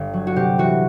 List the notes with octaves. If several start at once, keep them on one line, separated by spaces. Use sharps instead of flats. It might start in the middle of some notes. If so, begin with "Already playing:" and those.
Already playing: G1
F#3
F#4
C3 G4
E3 F#4